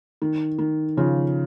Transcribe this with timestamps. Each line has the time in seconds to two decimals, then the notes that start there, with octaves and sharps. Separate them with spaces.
0.22 D#3
0.58 D#3
0.97 C#3 F3